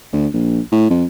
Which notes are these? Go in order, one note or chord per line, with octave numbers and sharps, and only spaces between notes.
D2
A#1
A2
F2